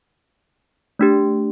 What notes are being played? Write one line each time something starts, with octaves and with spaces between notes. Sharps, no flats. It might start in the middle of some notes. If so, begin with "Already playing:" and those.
A3 D4 G4